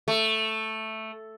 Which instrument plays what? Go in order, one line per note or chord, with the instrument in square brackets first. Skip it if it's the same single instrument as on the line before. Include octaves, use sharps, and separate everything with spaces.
[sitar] A3